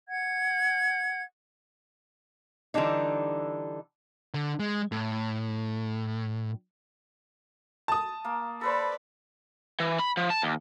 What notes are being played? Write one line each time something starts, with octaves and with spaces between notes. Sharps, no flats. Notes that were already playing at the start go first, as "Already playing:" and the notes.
F#5 G#6
D3 E3 G3 D4 D#4
D3
G#3
A2
A5 D#6
A#3
A4 B4 C5 D5 B5
E3
B5
F3
A5
D#2